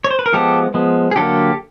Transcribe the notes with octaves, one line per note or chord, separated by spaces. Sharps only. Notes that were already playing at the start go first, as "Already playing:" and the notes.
C#5
C5
B4
A#4
F3 G#3 B3 G4 A4
F3 G#3 B3
G#4
D3 F#3 A#3 G4 A4